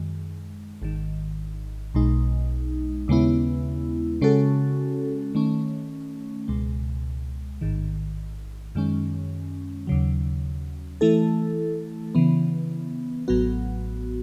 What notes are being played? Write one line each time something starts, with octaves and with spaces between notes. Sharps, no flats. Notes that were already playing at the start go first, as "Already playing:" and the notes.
Already playing: F#2 D#3 G#3
G#1 G#2 D#3
B1 B2 G#3 D#4
D#2 C#3 G#3 B3 E4
C#3 G#3 C#4 F#4 A4
D#3 A3 C#4
C#2 B2 G#3
A1 G#2 D#3
F#2 D#3 G#3 C#4
D#2 C#3 F#3
E3 A3 E4 A4
C#3 E3 B3
A1 A2 F#3 B3 F#4